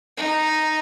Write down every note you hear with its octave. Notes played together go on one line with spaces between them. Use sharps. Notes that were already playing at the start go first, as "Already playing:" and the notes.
D#4